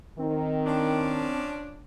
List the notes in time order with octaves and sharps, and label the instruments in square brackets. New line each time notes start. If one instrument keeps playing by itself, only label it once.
[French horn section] D#3 [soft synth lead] C4
[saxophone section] F3 C#4 D4